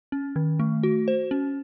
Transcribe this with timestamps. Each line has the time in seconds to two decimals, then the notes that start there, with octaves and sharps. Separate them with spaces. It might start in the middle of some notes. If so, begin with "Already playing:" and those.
0.12 C#4
0.36 D#3
0.60 A3
0.83 F#4
1.08 C5
1.31 C#4